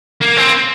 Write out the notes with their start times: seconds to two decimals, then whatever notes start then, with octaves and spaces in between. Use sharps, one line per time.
0.22 A#3
0.37 C4